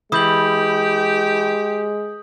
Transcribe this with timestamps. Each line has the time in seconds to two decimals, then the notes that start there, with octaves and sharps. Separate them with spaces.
0.12 E3 G#3 G4 D#6 G6 F#7